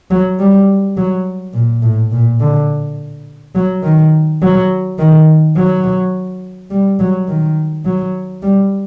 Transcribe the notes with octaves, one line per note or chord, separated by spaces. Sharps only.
F#3
G3
F#3
A#2
A2
A#2
D3
F#3
D#3
F#3
D#3
F#3
G3
F#3
D#3
F#3
G3